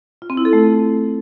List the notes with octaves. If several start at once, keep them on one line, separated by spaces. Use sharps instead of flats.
F4
C4
E4
A4
A3